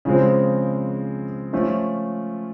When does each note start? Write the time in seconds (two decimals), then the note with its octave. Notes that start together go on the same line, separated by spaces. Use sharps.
0.05 C#3 F3 G#3 C4
1.53 F3 A3 C#4 F4